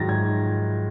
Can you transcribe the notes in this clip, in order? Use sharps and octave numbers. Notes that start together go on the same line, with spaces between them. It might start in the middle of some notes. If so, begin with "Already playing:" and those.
Already playing: G#2 D#3 F#3 A6 A#6
G#6